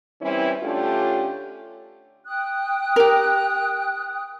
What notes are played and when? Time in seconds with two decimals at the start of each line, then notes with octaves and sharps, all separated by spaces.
0.22 E3 G3 C4 C#4 E4
0.62 D3 A3 C#4 D4 F4 G4
2.26 G5 D#6 F#6
2.96 G4 A#4